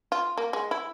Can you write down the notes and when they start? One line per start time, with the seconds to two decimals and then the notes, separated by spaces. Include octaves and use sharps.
0.12 F4
0.38 A#3
0.53 G#3
0.71 E4